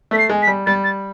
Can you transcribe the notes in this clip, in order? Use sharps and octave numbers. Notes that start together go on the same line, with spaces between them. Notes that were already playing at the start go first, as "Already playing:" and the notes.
A3 B6
C7
G#3
B6
G3
G3 A6
A6